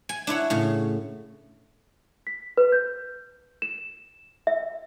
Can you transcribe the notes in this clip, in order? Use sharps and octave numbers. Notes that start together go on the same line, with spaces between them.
G#5
D4 E4 C#5 F#5
A2 C#3
B6
B4
G6
E7
E5